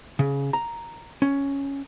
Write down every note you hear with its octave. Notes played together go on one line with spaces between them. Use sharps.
C#3
A#5
C#4